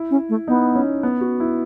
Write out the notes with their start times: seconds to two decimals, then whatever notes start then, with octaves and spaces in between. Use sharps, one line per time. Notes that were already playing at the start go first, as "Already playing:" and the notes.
Already playing: E4
0.11 C#4
0.29 A3
0.48 B3 D#4
0.75 C#4
1.03 B3
1.21 F#4
1.40 E4